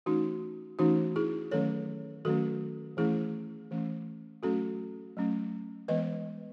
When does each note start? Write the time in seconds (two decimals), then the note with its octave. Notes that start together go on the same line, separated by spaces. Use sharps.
0.06 E3 A3 C#4 D#4 F#4
0.79 E3 A3 C#4 D#4 F#4
1.16 E4 G#4
1.51 D#3 F#3 A3 C#4 A4 C#5
2.25 D#3 F#3 A3 C#4 F#4 A4
2.97 E3 A3 C#4 E4 G#4
3.71 E3 A3 C#4
4.43 F#3 A3 C#4 F#4 A4
5.17 F#3 A3 C#4
5.88 E3 G#3 B3 B4 D#5